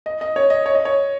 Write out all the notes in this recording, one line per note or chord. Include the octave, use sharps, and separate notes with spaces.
D#5
D#5
C#5
D#5
C#5
D#5
C#5